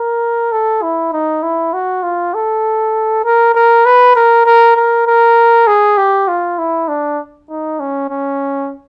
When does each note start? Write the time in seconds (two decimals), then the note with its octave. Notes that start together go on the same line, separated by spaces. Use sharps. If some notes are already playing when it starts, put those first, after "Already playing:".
Already playing: A#4
0.52 A4
0.82 E4
1.13 D#4
1.43 E4
1.73 F#4
2.03 F4
2.34 A4
3.25 A#4
3.54 A#4
3.86 B4
4.16 A#4
4.46 A#4
4.76 A#4
5.07 A#4
5.67 G#4
5.97 G4
6.28 F4
6.58 E4
6.88 D4
7.50 D#4
7.80 C#4
8.10 C#4